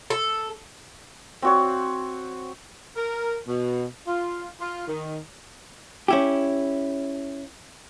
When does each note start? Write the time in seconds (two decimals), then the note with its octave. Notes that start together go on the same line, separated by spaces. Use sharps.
0.10 A4
1.42 C4 F#4 C#5
2.96 A#4
3.47 B2
4.06 F4
4.60 F4
4.87 D#3
6.08 C#4 E4 G4